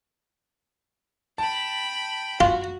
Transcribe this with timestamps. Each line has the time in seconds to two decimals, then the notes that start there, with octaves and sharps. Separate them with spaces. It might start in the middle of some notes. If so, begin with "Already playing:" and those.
1.38 G5 A5 B5
2.41 F4 F#4